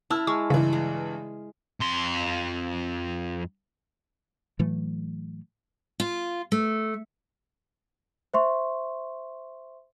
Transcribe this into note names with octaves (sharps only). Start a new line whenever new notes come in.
E4 A5 E6 F6
G#3 C#6
G2 C#3 E3
G#3
F2 C6
A2 E3 F#3 A3
F4
A3
C5 E5 C6 C#6